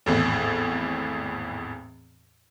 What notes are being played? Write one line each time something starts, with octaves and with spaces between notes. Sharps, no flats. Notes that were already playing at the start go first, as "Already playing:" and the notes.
G#1 E2 A2